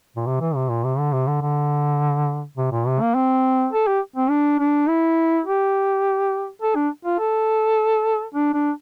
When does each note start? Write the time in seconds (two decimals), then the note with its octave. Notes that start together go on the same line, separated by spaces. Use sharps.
0.16 A#2
0.27 C3
0.41 E3
0.55 C3
0.69 A#2
0.84 C3
0.98 D3
1.12 C3
1.28 D3
1.41 D3
2.57 C3
2.72 A#2
2.87 C3
3.01 A#3
3.15 C4
3.73 A4
3.87 G4
4.16 C4
4.30 D4
4.59 D4
4.88 E4
5.45 G4
6.62 A4
6.75 D4
7.05 F4
7.19 A4
8.34 D4
8.54 D4